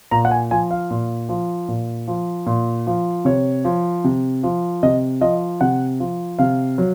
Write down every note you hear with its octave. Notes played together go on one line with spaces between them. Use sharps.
A#2 A#5
F#5
G#5
F3 G#5
F5
A#2
F3
A#2
F3
A#2
F3
C3 C#5
F3
C3
F3
C3 D#5
F3 D#5
C3 F#5
F3
C3 F5
F#3